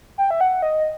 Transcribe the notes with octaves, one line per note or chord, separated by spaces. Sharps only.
G5
E5
F#5
D#5